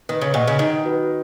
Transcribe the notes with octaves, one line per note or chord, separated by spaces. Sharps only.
D#3 B4
C#3
A#2 D#5 F#5 C#6
C#3
D#3 D#4
F#4 B4